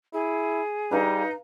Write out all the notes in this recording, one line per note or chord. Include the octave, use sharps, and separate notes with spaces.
E4 G#4
G3 D#4 B4 F5 A#5